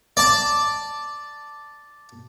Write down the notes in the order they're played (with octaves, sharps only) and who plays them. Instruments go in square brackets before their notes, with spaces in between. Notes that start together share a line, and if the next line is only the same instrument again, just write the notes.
[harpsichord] D5 A5